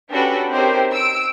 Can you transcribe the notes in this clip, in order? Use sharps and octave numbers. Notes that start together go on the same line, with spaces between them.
C#4 D4 F#4 G4 A4 B4
C4 D#4 G4 A#4 C5 C#5
E6 D7